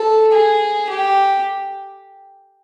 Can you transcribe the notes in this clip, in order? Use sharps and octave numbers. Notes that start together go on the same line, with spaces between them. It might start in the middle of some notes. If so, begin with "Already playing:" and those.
Already playing: A4
G#4
G4